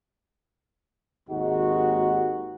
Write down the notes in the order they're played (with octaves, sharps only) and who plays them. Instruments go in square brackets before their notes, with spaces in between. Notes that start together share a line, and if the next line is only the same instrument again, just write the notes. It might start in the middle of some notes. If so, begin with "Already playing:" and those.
[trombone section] G#1 D#2 G#3 D#4 F#4